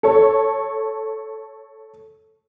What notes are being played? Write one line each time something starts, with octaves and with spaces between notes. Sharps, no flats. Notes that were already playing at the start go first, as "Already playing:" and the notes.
A4 C#5